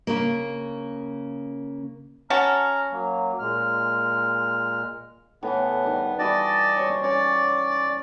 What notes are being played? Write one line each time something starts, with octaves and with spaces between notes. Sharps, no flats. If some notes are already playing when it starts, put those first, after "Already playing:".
C#3 A#3
C#4 F#4 A5 A#5 F6
F#3 A#3
A#2 G#3 F6
A2 E3 B3
D#3 G3
E3 G3 F#4 D5 D#5 A5
C5 C#5
C#4 C#5 D5